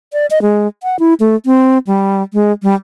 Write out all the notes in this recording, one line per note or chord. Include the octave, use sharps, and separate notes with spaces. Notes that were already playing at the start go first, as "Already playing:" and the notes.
D5
D#5
G#3
F#5
E4
A3
C4
G3
G#3
G3